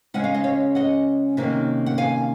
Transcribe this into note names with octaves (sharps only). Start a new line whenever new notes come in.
C#3 G#3 C#4 F#5
F5
D#5
C#5 F5
D#5 F#5
C3 D#3 A#3 C#4
F#5
F5 G#5